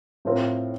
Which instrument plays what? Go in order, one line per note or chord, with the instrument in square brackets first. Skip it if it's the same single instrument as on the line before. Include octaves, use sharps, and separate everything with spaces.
[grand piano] A2 A3 C4 F4 A#4